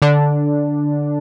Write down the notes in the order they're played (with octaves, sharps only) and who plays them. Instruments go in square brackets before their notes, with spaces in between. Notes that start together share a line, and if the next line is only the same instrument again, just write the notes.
[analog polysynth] D3 D4